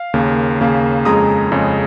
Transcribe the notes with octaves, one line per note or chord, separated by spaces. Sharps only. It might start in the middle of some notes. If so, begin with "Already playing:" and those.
Already playing: F5
D#2 C#3 A#3
D#2 C#3 A#3
F2 C#3 G#3 A#5 D#6
F2 C#3 G#3